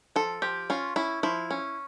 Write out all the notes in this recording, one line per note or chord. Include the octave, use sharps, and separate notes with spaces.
F3 A4
F3 G4
C#4 F4
C#4 E4
F3 E4
C#4